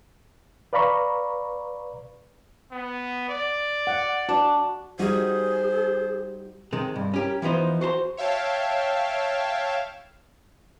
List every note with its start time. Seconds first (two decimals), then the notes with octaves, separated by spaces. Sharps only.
0.73 B4 D5 F5 A#5 B5 C#6
2.72 B3
3.29 D5
3.87 F#5
4.29 D4 F#4
4.99 G3 D#4 F#4 G#4 C5
6.73 C3 D#3 G#3
6.96 G2
7.14 C#4 G4 A#4
7.42 E3 F3 B3 D#4 C5
7.81 F#4 C5 A5 C6
8.17 C#5 E5 F5 G5 A5